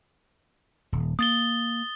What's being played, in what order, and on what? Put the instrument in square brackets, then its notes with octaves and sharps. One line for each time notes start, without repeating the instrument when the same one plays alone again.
[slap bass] D#1
[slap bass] A#3 [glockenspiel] D#6 A6 G7